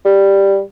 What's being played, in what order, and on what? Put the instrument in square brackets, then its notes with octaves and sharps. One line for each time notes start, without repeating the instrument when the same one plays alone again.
[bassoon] G3